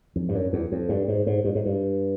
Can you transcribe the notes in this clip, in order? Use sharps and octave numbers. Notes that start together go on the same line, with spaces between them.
F2
G2
F#2
E2
F2
G2
G#2
G#2
G2
G#2
G2